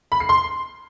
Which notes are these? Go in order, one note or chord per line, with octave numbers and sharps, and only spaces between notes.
B5
C7
C6